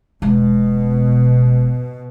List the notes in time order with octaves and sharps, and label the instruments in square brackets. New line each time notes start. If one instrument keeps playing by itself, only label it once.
[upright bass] E1 G#3 [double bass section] B2